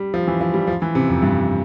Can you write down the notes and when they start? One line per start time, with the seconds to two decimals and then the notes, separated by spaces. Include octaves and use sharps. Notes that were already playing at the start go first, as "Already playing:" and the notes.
Already playing: G3
0.14 F3
0.27 E3
0.41 F3
0.54 G3
0.68 F3
0.82 E3
0.95 C3
1.09 F2
1.22 G2